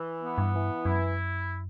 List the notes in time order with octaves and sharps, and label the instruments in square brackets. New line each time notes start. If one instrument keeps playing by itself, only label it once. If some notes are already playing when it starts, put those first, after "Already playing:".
Already playing: [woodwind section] E3
B3
[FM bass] G2
[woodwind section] E3
[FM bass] F#2 [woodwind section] E4